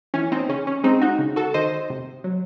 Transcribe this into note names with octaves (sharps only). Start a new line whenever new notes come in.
E3 C#4
C4 D#4
C#3 C#4
C#4
G#3 C4 D#4
D#4 F#4
C#3
F#4 A4
D#3 C5 D#5
C3
F#3